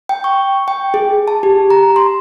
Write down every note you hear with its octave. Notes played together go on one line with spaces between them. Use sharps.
G5
C#6
G5
G#4
A5
G4
A#5
C6